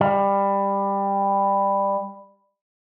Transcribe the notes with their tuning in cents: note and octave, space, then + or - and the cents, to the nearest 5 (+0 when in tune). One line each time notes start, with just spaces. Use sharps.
G3 +15